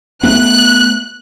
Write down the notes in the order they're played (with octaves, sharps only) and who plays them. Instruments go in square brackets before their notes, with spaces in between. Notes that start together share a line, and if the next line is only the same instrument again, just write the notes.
[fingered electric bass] A3 B3 [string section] F#6